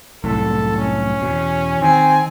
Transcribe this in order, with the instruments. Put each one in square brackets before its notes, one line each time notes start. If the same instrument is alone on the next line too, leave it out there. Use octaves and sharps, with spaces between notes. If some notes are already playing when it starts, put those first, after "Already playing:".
[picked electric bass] C2 F#2 A2 [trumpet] A4
[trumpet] C#4
[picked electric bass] E2 B2
[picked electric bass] D#3 [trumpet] C4 [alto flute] G#5